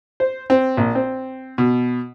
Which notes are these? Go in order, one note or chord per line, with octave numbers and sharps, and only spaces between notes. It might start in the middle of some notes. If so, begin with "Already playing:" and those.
C5
C4
A#1
C4
B2